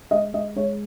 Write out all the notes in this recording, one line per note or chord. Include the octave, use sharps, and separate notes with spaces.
G#3 D#5
G#3 D#5
G#3 C#5